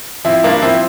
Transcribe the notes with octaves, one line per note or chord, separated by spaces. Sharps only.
F3 C4 E4
G2 A#3 D4
F3 C4 E4